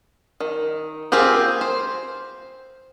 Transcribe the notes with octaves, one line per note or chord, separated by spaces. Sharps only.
D#3
A#3 C4 F4 G4 G#4
C5